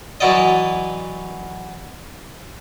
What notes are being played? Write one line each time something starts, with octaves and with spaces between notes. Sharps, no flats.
E3 F#3 E4 F#4 D5 D#5